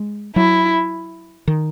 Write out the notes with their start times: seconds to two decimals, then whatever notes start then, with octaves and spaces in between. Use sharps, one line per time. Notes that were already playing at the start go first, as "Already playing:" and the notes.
Already playing: G#3
0.36 F#3 E4
1.48 D#3